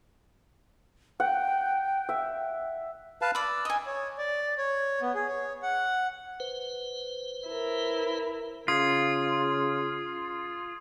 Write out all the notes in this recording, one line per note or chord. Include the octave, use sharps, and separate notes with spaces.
F#5 G5
E5
B4 F5 A5
D5 B5 E6
D#5 G#5
C#5
D5
C#5
B3
G#4
C#5
F#5
B4 C5
E4 A#4
C#3 F4 D#6 G#6